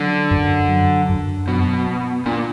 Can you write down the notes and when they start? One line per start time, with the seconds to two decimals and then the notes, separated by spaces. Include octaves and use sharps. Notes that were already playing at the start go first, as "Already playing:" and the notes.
Already playing: D3 F#3
0.31 F#2
0.69 F#3
1.09 F#2
1.48 B2 F#3
1.87 B3
2.26 A#2 D4